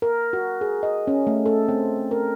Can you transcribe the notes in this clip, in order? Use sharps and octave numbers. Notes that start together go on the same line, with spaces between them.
A#4
F#4
G#4
D#5
C#4
A3
A4
C4
A#4